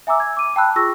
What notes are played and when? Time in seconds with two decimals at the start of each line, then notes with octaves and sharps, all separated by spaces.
0.07 E5 G#5 A#5 D6 E6
0.20 G#6
0.37 D6 D#7
0.56 G5 A5 B5 E6 F#6
0.76 F4 G#4 C#6 E6 A#6